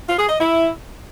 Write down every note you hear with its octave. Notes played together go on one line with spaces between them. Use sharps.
F4
G#4
D#5
E4